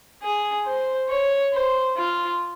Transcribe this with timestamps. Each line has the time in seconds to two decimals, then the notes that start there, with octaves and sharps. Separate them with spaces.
0.23 G#4
0.66 C5
1.09 C#5
1.53 C5
1.97 F4